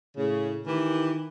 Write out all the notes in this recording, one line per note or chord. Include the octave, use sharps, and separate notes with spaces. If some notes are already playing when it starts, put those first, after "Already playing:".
A2 C#3
D#3 E3 G4 A#4